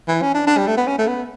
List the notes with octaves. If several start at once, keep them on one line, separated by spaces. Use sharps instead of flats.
E3
C#4
D4
D4
G3
A3
B3
C#4
A3
B3